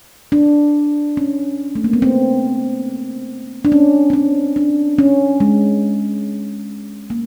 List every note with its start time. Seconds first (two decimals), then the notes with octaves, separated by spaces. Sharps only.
0.32 D4
1.17 C#4
1.75 A3
1.84 A#3
1.93 B3
2.02 C4
3.65 D4
3.72 C#4
4.10 C4
4.13 C#4
4.56 D4
4.99 C#4
5.40 G#3
7.10 A#3